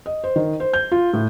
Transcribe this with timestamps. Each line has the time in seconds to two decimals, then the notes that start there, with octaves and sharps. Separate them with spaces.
0.06 D#5
0.24 C5
0.36 D#3
0.60 C5
0.74 G6
0.92 F4
1.13 A2